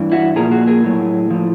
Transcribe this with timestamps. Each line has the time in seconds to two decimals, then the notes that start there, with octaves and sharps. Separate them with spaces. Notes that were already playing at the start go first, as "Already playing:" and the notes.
Already playing: G2 E3
0.12 E4 F#4
0.36 A#2 F3 G#4 A#4
0.52 F#4 G#4
0.67 G#4 A#4
0.84 A2 F#3
1.31 A2 F3